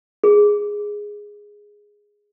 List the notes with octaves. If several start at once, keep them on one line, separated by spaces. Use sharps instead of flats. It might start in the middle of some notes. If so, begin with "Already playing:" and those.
G#4